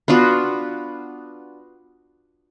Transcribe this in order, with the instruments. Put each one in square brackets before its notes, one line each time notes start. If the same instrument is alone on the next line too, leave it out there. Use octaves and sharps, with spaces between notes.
[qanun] B3 D4 F4 F#4